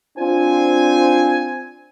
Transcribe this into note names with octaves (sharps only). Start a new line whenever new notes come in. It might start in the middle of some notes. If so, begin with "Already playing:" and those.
C4 D4 F4 C5 G#5